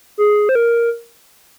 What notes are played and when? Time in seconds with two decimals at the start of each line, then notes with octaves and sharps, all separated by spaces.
0.18 G#4
0.49 C5
0.55 A#4